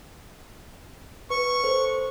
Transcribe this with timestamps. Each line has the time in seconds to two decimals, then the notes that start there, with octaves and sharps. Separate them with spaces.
1.30 B4 C#6
1.64 A4 C5